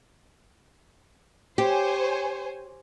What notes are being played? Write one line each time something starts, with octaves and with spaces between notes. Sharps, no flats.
G4 C5 C#5 G#5